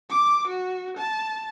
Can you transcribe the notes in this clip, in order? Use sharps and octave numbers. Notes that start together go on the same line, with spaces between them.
D6
F#4
A5